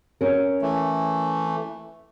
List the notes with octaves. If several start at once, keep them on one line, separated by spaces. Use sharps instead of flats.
C#4 A#4
E3 A3